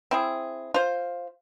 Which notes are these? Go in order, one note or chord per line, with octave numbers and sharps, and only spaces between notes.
C4 E4 G#4
F4 C5